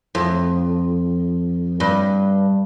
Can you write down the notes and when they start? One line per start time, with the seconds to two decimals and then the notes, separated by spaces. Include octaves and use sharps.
0.15 F2
1.80 G2